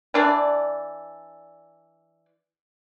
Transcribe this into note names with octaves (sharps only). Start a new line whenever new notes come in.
E3 D4 D5